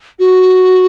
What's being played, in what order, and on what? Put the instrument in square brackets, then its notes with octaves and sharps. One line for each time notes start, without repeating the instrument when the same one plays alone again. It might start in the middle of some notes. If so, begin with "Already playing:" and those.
[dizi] F#4